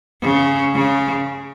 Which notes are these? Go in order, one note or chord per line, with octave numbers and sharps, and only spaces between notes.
C#3
C#3